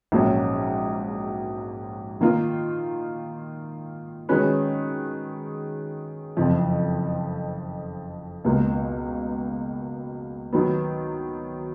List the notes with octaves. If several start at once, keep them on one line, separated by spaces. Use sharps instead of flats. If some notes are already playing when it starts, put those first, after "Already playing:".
A#1 G#2 F#3 A#3 C#4
D#3 A#3 F4
D#3 G#3 C#4 F#4 B4
F#1 F2 F3
C#2 B2 A#3
D#3 F#3 B3